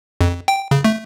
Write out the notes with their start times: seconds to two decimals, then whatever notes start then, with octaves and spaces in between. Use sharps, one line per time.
0.21 F2
0.48 G5
0.71 C#3
0.84 A3